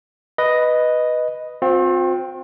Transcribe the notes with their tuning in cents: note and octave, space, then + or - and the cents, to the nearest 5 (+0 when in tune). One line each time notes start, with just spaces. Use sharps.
B4 +0 D#5 +0
C4 +0 F4 +45